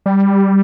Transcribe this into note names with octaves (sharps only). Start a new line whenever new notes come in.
G3